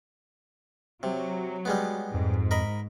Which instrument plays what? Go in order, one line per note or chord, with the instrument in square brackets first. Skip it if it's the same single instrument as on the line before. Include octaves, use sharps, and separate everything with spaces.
[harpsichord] C3 [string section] F#3
[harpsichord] G3 G#3 B3
[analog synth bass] F2 [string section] G#2
[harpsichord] A#4 D#5 B5